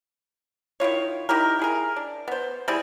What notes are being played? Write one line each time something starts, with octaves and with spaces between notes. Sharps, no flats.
D#3 E4 F4 C#5
D#4 E4 G4 A#4
E4 G#4 A#4
D4
B3 C5
G3 C4 E4 G#4